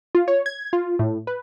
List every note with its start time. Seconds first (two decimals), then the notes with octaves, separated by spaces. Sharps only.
0.15 F4
0.28 C#5
0.46 G#6
0.73 F4
0.99 A2
1.27 B4